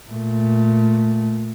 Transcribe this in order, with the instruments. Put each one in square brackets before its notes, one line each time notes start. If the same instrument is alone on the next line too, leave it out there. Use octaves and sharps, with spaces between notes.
[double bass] A#2 A3